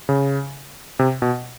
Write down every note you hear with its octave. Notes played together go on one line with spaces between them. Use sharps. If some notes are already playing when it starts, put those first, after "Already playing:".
C#3
C3
B2